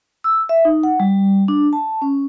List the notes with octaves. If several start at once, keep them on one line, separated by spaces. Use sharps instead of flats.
E6
E5
D#4
F#5
G3
D4
A5
C#4